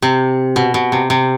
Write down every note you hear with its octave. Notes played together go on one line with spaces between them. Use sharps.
C3
B2
B2
C3
C3